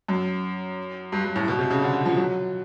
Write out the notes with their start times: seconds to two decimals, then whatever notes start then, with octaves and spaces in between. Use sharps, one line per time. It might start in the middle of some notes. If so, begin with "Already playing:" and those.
0.08 F#2
1.12 G2
1.24 G2
1.36 A2
1.48 B2
1.59 C3
1.70 C#3
1.82 D3
2.05 F3
2.17 F#3